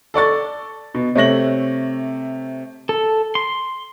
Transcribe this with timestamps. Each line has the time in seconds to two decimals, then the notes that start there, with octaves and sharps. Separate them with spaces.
0.14 A4 D5 C#6 A6
0.94 B2
1.16 C3 A3 C#5 A#6 F#7
2.89 A4
3.35 C6